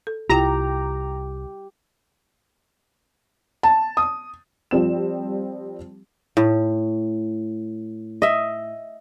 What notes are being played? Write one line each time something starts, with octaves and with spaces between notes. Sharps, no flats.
A4
C2 E4 F4 G4 A#5
A5
D#6
F3 G3 C4 E7
A2
D#5 E5